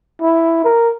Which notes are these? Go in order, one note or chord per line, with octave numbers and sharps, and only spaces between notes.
E4
A#4